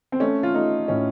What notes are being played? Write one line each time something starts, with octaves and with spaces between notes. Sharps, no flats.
C4
A3 C#4
F4
A3 D#4
A2 C#4